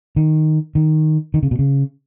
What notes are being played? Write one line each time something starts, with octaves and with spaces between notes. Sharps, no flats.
D#3
D#3
D#3
C#3
B2
C#3